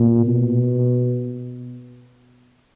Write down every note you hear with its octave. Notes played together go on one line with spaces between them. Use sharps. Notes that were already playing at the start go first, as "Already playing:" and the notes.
Already playing: A#2
B2